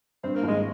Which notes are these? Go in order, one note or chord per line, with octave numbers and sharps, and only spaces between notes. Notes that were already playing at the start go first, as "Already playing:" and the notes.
G2 C4
A#3
G#1 G#3